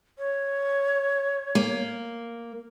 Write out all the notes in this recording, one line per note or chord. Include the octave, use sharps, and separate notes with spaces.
C#5
A#3